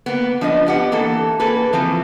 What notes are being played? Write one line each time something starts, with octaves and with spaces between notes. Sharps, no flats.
A#3 B3
F3 D4 B4 D#5
B3 G4 F#5
E3 A#3 A4
A#3 G#4 A4 B4
E3 F3 C4 F4